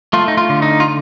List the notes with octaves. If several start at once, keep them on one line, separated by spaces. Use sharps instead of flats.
A3 F4
D#4
F4
D3
D#4
F4